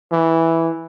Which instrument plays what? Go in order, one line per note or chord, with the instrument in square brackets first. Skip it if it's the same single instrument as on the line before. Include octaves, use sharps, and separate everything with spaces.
[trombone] E3